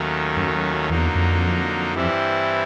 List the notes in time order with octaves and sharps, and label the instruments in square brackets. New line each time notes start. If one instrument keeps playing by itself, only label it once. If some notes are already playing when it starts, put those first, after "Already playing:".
Already playing: [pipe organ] D#2 D#3 F#3 A3 C#4
[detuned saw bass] F#2
[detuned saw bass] E2 [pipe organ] D3 F#3 A#3 D#4
[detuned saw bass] F2
[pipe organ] G2 E3 G3 C4 E4